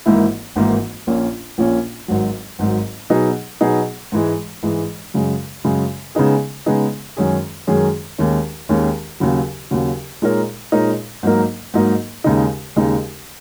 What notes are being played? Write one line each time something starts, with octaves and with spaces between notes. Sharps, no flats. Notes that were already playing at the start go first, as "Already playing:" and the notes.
G#1 G#2 E3 A#3 E4
G#1 G#2 E3 A#3 E4
A#1 A#2 A#3 C#4
A#1 A#2 A#3 C#4
G#1 G#2 F#3
G#1 G#2 F#3
B2 F#3 B3 D#4 G#4
B2 F#3 B3 D#4 G#4
G#2 E3 G#3
G#2 E3 G#3
F#2 C#3 G#3
F#2 C#3 G#3
C#3 G#3 B3 D#4 G#4
C#3 G#3 B3 D#4 G#4
F#2 D#3 G#3 C#4 G#4
F#2 D#3 G#3 C#4 G#4
D#2 D#3 G#3 C#4
D#2 D#3 G#3 C#4
D#2 C#3 F#3
D#2 C#3 F#3
A#2 G#3 D#4 A#4 C#5
A#2 G#3 D#4 A#4 C#5
G#2 F#3 A#3 D#4 A#4
G#2 F#3 A#3 D#4 A#4
D#2 C#3 G#3 D#4
D#2 C#3 G#3 D#4